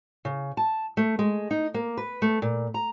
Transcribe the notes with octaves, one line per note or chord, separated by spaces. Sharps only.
C#3
A5
A3
G#3
D#4
A#3
B4
A3
A#2
A#5